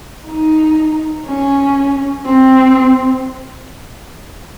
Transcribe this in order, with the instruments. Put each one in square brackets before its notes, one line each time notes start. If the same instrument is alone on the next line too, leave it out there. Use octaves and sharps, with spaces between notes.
[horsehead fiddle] D#4
C#4
C4